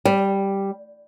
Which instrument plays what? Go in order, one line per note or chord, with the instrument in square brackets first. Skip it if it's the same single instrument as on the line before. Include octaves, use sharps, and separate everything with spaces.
[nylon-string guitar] G3